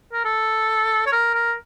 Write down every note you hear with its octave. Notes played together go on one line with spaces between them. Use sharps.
A#4
A4
C#5
A#4
A#4